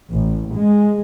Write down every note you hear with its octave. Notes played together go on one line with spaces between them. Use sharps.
A1
G#3